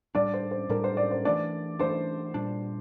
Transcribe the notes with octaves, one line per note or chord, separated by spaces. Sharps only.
A2 G3 D4 D5
C5
C5
A2 G3 D4 A#4
C5
D5
C5
E3 A3 D4 D5
E3 A3 D4 C5
A#2 G3 D4